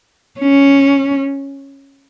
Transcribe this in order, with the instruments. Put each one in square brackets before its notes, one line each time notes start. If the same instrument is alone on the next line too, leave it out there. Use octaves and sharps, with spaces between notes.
[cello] C#4